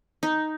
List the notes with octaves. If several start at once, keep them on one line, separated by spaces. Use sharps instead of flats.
D#4